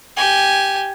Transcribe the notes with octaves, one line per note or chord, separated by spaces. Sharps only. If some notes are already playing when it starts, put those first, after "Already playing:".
G4 G#5